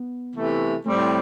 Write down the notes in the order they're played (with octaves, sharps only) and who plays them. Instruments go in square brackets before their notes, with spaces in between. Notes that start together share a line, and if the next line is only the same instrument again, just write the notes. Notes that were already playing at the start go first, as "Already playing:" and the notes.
Already playing: [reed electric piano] B3
[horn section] C3 E3 A3
[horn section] A2 G3 C4 [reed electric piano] A3